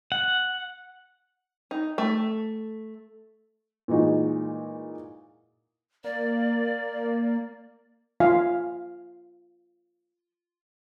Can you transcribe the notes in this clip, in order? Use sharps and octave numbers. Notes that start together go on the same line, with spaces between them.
F#5
D#4
A3
A#2 E3 G#3 D#4 F#4
A#3 D5
F4 E5 F5 G#5